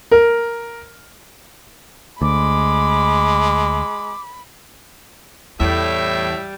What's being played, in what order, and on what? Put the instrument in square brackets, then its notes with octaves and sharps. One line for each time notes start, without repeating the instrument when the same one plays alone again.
[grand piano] A#4
[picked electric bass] D2 [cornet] G#3 [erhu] B5 [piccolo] D6
[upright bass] E2 [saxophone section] A2 [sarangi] G3 [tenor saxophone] E5